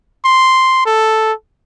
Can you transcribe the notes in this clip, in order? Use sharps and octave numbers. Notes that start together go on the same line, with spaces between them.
C6
A4